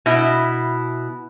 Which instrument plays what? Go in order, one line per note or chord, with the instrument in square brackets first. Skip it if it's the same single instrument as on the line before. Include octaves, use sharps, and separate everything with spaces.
[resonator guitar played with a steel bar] B2 E4